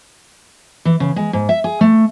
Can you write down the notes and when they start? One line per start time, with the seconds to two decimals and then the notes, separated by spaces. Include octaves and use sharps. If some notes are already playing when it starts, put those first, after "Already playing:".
0.85 E3
1.00 C#3
1.16 G#3
1.33 G#2
1.49 E5
1.64 G#4
1.81 A3